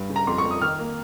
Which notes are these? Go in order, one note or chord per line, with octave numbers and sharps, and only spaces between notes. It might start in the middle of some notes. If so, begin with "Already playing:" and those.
Already playing: G2
C#3
A#5
F2 C6
C#6
F2
D#6
D#3 F6
A#3